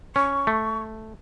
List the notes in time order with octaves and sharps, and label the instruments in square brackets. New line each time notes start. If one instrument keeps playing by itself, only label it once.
[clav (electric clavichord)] C#4 [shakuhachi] C#6
[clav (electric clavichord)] A3